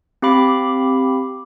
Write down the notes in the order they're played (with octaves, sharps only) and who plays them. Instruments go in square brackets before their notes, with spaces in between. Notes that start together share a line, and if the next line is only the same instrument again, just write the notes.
[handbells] C4 G4 F5 B5 D6